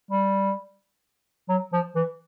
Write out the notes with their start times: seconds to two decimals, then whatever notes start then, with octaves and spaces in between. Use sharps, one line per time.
0.11 G3
1.49 F#3
1.73 F3
1.95 E3